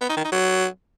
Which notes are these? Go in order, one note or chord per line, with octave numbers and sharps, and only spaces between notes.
B3
D#4
D#3
D#4
F#3